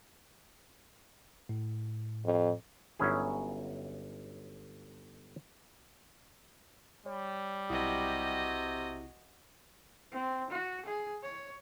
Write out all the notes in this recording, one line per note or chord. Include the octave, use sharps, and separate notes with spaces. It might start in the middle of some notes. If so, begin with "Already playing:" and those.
A2
F2
G1 F#3 C#4 E4 G#4
G3 C#5
B1 C3 E4 F#4 D#5 D#6
C4
F#4
G#4
C#5